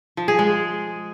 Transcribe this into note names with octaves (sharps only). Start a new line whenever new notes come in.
F3
G#4
G#3